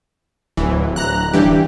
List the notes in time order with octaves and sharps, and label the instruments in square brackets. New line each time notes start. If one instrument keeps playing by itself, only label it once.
[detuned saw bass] D1 [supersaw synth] E3
[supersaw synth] A#5 F#6
[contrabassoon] G2 [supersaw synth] E3 G4